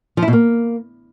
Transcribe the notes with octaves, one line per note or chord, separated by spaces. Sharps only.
F3
E4
B2
A#3